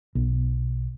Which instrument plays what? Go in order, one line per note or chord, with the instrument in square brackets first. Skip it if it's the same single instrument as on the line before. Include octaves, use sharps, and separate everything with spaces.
[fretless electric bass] B1